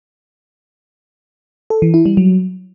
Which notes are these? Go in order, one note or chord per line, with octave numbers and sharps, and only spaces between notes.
A4
E3
E4
G3
F#3